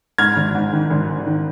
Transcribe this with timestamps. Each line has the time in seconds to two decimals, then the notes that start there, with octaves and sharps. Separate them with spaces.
0.18 G#2 F6 G#6
0.36 G#1
0.55 G#2
0.73 D#3
0.90 G#1
1.08 G#1
1.27 D#3